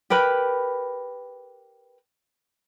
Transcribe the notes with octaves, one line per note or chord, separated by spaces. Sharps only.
G4 A#4 B4 B5